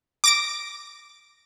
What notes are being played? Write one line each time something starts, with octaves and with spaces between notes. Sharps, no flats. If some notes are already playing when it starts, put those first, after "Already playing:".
D6 A#6 D7